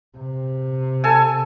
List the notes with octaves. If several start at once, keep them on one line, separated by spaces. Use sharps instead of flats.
C3
A4 G#5